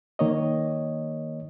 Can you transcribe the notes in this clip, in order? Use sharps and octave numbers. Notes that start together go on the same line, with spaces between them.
D#3 A#3 C#5 D#5